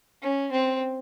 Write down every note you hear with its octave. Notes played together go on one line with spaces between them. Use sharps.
C#4
C4